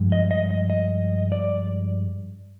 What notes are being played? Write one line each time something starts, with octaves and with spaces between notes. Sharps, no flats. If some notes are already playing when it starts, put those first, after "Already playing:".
Already playing: G2 F3 G#3
D#5
D#5
D#5
D#5
D5